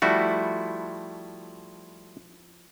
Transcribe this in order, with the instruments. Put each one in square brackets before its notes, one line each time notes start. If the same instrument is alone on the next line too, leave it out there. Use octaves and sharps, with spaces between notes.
[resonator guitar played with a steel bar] F3 E4 [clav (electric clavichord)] G3 A3 F#4